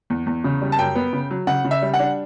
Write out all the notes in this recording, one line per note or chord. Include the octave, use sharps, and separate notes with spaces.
E2
E2
C#3
G3
A5
F#2 G5
B3
C#3
F#3
C#3 F#5
C#3
E5
G3
F#5
D4